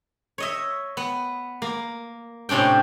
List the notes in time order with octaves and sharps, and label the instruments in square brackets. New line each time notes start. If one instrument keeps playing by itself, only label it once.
[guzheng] C#5 D#5 E5
B3
A#3
A2 C3 C#4 D4 G5